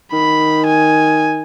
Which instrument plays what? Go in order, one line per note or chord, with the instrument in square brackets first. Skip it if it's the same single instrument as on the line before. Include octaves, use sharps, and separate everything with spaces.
[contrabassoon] D#3 [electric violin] B5
[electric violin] G#5